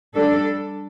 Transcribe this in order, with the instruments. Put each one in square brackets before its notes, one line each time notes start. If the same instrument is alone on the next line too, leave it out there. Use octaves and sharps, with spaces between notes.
[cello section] G3 D4 A4